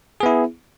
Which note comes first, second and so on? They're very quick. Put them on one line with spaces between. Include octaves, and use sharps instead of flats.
G#4 B3 E4